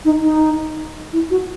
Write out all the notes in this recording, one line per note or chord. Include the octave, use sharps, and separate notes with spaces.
D#4
D#4
E4
F#4